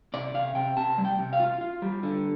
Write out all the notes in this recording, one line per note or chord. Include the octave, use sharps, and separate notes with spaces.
C3 D5
C3 F5
C3 G5
C3 A5
G3
G5
C3
F5
F4
F4
G3
D3